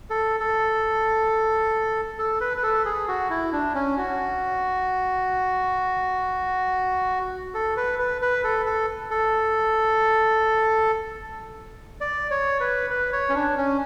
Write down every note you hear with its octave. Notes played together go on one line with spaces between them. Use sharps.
A4
A4
A4
B4
B4
A4
G#4
F#4
E4
D4
C#4
F#4
A4
B4
B4
B4
A4
A4
A4
D5
C#5
B4
B4
C#5
C#4
D4
C#4